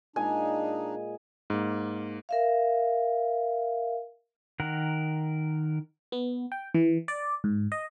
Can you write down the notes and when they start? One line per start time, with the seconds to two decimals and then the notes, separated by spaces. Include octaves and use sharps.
0.16 A#2 G#3 D4 D#4 G#5
1.50 G#2 A#3
2.29 A#4 E5 F5
4.60 D#3 A#4 F#5
6.12 B3
6.52 G5
6.74 E3
7.08 D5
7.44 G#2
7.72 D#5